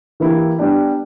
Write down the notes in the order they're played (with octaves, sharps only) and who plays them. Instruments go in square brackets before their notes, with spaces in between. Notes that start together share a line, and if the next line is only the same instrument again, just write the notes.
[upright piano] E3 A#3 E4 G4
G3 B3 D4 G4